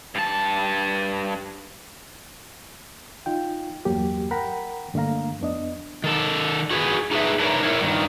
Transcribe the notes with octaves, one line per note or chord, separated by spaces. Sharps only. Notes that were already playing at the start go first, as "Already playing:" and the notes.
G2 A5
D#4 F4 G5
E2 G2 F#3 A#3 G4
A#4 F#5 G5 A#5 B5
G2 D3 A3 A#3 F5 A#5
F2 B3 D4 D#5
D#3 A4
F#4 G#4 B4
D#4 G#4 A4 B4 E5
D4 D#4 A#4 B4 C#5
E4 A#4 C#5
G2 D#3